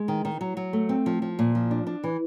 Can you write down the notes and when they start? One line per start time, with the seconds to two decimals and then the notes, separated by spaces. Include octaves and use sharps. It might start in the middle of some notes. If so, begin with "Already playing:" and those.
Already playing: G#3
0.08 D#3
0.25 D#3
0.41 F#3
0.57 F#3
0.73 A3
0.89 C4
1.06 F3
1.22 F3
1.39 A#2
1.55 F3
1.71 D4
1.87 D4
2.04 E3